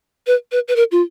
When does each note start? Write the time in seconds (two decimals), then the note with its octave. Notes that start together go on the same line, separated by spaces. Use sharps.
0.27 B4
0.52 B4
0.68 B4
0.76 A#4
0.92 F4